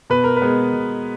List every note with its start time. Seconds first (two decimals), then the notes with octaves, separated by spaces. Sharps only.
0.10 B2 B4
0.24 A#4
0.37 B4
0.42 G#3 B3
0.73 B2